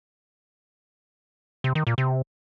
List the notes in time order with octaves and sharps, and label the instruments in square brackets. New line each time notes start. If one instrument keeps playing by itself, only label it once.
[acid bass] C3
D#3
A#2
C3